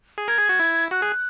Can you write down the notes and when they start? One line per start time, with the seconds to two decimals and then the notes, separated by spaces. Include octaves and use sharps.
0.18 G#4
0.28 A#4 G#6
0.39 G#4
0.49 F#4
0.60 E4
0.91 F#4 F#6
1.02 G#4